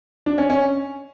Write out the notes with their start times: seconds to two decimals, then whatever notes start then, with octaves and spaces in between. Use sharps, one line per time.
0.26 D4
0.38 C#4
0.50 C#4